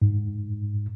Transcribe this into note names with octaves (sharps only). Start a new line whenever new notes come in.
G#2